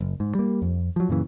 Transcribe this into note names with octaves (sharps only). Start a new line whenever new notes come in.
F#1
G#2
G3 A#3
F2
F3 F#3
F#2 A#2 C#3 E3